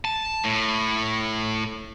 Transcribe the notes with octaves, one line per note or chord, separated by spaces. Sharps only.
A5
A2